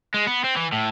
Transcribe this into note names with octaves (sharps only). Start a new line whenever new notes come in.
G#3
B3
C4
E3
A2